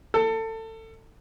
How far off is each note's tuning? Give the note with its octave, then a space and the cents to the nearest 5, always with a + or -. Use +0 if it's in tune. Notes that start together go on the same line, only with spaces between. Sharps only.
A4 +25